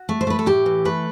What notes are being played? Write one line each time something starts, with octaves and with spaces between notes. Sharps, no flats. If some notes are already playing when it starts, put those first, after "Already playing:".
Already playing: F#4
A3
C5
A3 B4
A4
A2 G4
E3
A3 B4